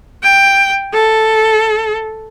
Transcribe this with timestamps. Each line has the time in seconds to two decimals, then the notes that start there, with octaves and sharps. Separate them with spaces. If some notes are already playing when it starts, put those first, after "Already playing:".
0.23 G5
0.93 A4